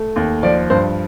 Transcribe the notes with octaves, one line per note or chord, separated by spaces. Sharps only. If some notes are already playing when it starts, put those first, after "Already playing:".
Already playing: A3
D#2
F3 D5
G2 C5